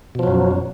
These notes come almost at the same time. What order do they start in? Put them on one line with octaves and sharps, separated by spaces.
B2 F3 F#3 F#2